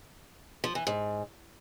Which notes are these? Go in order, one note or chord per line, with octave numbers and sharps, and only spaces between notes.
F3
E3
G#2